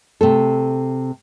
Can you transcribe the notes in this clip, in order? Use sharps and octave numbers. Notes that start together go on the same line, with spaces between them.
C3 A3 A4